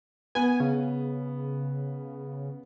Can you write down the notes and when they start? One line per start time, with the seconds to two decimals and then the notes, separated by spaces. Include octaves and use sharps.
0.35 B3 G#5
0.60 C#3